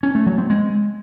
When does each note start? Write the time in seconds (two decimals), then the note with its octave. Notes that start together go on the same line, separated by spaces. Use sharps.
0.03 C#4
0.15 A3
0.26 F#3
0.38 C4
0.50 G#3